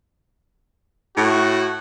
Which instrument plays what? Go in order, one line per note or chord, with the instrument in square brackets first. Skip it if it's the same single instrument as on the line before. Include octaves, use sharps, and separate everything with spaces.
[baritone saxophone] A2 [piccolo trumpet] F#4